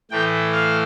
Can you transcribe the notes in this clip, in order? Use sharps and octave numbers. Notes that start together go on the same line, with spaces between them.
A2 E3 A3 G5
F5